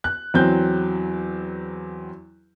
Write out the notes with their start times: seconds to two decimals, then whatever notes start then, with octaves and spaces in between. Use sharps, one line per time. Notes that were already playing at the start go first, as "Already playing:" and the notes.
0.04 F#6
0.34 E2 F#3 C4 G6